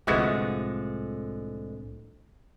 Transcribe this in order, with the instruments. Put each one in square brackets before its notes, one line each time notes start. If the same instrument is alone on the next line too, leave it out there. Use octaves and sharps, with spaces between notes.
[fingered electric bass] C2 A2 [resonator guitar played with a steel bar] D3 F3 G#3 [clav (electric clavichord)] B3 E4 F#4